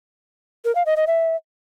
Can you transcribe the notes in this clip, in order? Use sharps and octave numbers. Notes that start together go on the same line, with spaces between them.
A#4
F5
D#5
D#5
E5